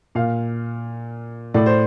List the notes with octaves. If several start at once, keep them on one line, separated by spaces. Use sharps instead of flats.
A#2 F5
A2 D5
C5